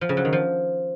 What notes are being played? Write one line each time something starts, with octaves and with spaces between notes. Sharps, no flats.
F3
C#3
F#3
D#3
F3